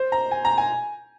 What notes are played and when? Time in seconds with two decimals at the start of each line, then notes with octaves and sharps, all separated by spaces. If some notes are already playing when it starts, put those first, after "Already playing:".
Already playing: C5
0.12 A#5
0.31 G#5
0.45 A#5
0.58 G#5